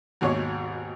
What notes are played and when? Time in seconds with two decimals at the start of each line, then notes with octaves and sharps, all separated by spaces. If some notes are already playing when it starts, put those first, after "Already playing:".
0.21 G#1 D#2 G#2 B2 C#5